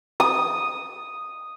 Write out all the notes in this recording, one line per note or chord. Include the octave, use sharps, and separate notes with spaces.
D#6